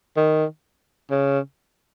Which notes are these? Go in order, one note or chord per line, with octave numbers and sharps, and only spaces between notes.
D#3
C#3